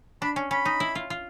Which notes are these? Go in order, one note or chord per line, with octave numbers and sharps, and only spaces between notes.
D4 B5
C#4
C#4 B5
D#4
E4
F4
F4